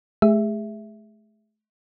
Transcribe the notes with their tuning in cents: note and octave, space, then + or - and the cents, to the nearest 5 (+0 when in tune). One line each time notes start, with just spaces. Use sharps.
A3 -40 G#4 -35 E5 +0